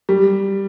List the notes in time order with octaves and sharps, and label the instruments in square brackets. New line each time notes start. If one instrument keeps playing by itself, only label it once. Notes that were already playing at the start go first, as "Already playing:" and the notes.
[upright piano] G3